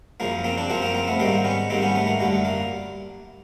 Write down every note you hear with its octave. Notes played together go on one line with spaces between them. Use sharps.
F#2 C#3 F3 A#3
A#3 C4
C4 D4
F#2 C#3 F3 A#3 C4
A#3 C4
A#3 C4
A3 B3
G#2 D#3 G3 A#3 C4
B3 C#4
G#2 D#3 G3 A#3 C4
B3 C#4
A3 B3
A#3
F#2 D3 G3 A3
A#3